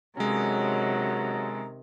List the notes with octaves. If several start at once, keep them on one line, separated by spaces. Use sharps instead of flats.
C3 D#3 F#3 G#3 C#4 G#4 A4 A#5